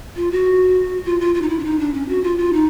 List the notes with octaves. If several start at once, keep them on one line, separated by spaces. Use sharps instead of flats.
F4
F#4
F4
F4
F4
D#4
E4
D4
D#4
D4
C#4
F#4
F4
F4
D#4